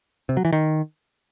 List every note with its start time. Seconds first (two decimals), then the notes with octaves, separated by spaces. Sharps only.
0.29 C3
0.37 F#3
0.45 E3
0.52 D#3